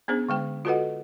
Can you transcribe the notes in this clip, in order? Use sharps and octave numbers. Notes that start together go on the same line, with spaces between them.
B3 C#4 D4 G#4 C5
D3 G#3 G5
F4 F#4 A4 B4 D#5 F#5